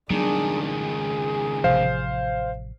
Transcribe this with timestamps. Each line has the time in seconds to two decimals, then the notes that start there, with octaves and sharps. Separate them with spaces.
0.10 C#2 D#3 F#3 G3 B3 D4 G#4
0.64 G#4
1.64 A1 C3 F3 C5 F5